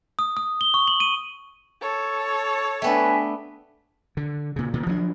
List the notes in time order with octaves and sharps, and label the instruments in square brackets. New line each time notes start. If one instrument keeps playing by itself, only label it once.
[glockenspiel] D#6
D#6
G7
C#6
F#7
D#7
[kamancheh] A4 C#5
[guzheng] A3 B3 D4 [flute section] B4 G5 G#5
[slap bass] D3
A#2 C#3
A#2 D#3
F3 F#3 C4 D4